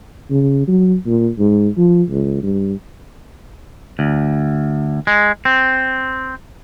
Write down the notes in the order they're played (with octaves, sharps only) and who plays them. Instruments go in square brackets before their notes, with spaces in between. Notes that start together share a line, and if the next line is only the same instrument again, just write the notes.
[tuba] C#3
F#3
A#2
G#2
F3
C#2
G2
[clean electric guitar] D2
G#3
C4